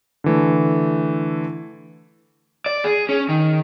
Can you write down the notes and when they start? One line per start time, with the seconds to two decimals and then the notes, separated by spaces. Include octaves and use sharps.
0.24 D3 E3 A3
2.66 D5
2.84 G#4
3.09 C#4
3.29 D#3